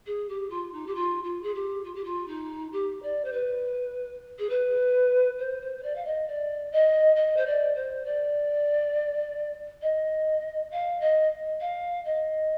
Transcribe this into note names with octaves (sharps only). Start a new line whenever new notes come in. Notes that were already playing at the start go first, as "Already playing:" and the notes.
G#4
G4
F4
D#4
G4
F4
F4
G#4
G4
F4
G4
F4
D#4
G4
D5
C5
B4
G#4
B4
C5
C5
C5
D5
F5
D#5
D5
D#5
D#5
C5
D5
C5
D5
D#5
F5
D#5
F5
D#5